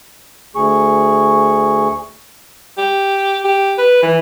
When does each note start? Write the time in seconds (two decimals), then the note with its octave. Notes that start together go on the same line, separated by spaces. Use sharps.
0.55 D2 G#4 C#6
2.78 G4
3.44 G4
3.78 B4
4.02 E3